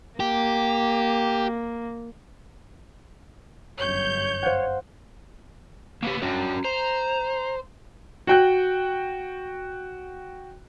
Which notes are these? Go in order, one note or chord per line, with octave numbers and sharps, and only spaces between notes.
A#3 G4
G1 F#2 C#5 G6
C5 F5 F#5
C#3 A#3 B3 G4
G2 C#4 F#4 C#5
C5 A#5
F#4 G5 F#6